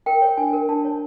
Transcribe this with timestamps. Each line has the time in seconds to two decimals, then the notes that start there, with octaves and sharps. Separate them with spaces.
0.06 A#4 G5
0.22 C#5
0.37 D4 G#5
0.53 A#4
0.69 D4 A5
0.84 C#5